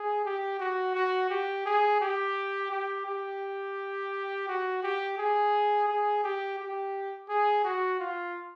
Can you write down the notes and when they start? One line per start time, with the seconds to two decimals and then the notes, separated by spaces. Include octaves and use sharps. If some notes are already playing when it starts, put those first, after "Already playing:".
Already playing: G#4
0.25 G4
0.59 F#4
0.95 F#4
1.30 G4
1.66 G#4
2.01 G4
2.71 G4
3.06 G4
4.48 F#4
4.83 G4
5.18 G#4
5.88 G#4
6.24 G4
6.59 G4
7.29 G#4
7.64 F#4
8.00 F4